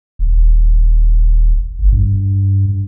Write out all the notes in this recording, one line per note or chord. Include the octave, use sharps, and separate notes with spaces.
D#1
G1
G2